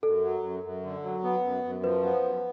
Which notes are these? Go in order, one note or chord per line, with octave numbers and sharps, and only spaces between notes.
F#2 A4
F#3
F#2
F#2
D3
F#3
B3
F#2
F#2
F3 B4
B3
F#2